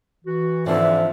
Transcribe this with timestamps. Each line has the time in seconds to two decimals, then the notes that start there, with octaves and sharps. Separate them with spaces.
0.25 E3 F#4
0.66 G#2 D3 E3 F3 C4 E5